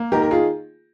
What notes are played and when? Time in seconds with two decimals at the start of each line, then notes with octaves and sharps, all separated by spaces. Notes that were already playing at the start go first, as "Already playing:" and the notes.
Already playing: A#3
0.12 D#3 G4 A#4
0.22 A#4
0.31 F4 G#4